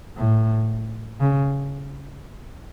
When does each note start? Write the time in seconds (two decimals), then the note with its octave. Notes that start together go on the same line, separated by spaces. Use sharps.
0.17 A2
1.20 C#3